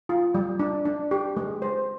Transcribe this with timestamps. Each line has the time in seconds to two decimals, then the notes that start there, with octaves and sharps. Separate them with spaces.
0.09 F4
0.35 G3
0.60 D4
0.85 D4
1.11 G4
1.37 G#3
1.62 C5